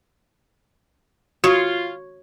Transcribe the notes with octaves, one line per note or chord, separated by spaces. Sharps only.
F4 F#4 C#5